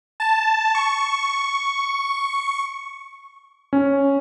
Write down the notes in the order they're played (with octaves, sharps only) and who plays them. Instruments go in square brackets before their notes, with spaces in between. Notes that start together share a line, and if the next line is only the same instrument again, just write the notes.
[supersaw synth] A5
C#6
[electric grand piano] C#4